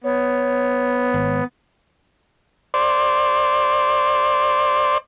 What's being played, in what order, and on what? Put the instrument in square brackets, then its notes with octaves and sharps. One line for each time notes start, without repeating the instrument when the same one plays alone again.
[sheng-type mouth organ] B3 [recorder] C#5
[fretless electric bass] G#1
[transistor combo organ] C5 D5